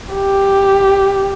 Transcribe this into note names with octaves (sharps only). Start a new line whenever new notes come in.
G4